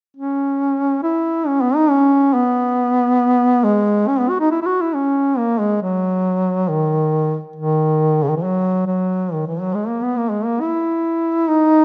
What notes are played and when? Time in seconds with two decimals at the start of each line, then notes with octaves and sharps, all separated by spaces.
0.16 C#4
1.03 E4
1.47 C#4
1.61 B3
1.75 D#4
1.90 C#4
2.34 B3
3.64 G#3
4.08 C#4
4.19 B3
4.30 F#4
4.40 D#4
4.51 E4
4.62 E4
4.66 F#4
4.81 E4
4.95 C#4
5.38 A#3
5.60 G#3
5.82 F#3
6.69 D#3
7.56 D#3
8.23 C#3
8.29 D#3
8.36 E3
8.44 F#3
8.87 F#3
9.33 D#3
9.47 E3
9.61 F#3
9.74 G#3
9.88 A#3
10.03 B3
10.18 A#3
10.31 G#3
10.45 A#3
10.61 E4
11.48 D#4